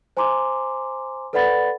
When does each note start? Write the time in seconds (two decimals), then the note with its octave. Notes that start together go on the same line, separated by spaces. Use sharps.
0.17 C5 G#5 A#5 C6 D6
1.33 A4 B4 D5 F#5 B5 A6